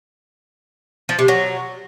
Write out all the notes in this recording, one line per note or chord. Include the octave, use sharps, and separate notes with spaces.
F3
C3
F#3